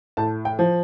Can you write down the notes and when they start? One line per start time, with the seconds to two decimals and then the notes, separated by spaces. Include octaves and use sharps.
0.17 A2 A5
0.45 G5
0.59 F3